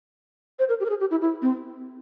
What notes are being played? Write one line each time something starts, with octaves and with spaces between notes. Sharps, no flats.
C5
A#4
G4
A#4
G#4
G4
E4
E4
C4